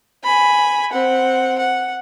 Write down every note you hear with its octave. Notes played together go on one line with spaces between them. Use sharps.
G#5 B5
C4 F#5
F#5